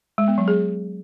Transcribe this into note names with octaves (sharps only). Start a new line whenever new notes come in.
G#3
B3
F#3
G#4